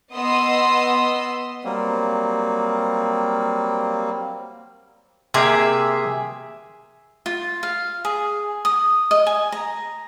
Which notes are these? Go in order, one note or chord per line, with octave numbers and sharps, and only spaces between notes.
B3 D#5 C6 D#6 E6
F#3 G3 A#3 C4
C3 A#3 G4 G#4 E5
F4
F5
G#4
D#6
D#5
G#5
A#5